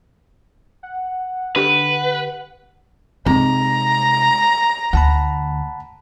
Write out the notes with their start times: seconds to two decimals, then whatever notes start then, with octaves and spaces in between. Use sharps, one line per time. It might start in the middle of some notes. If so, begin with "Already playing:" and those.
0.83 F#5
1.56 D3 G4 B4
3.26 C3 G#3 C4 D#4 A#5
4.93 D2 F#5 A5 B5